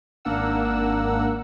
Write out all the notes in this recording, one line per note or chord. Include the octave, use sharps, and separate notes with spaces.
G#1 A#3 D4 A#4 F#5 E6